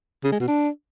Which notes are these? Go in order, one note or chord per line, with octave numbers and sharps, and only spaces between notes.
C#3
G#3
B2
D4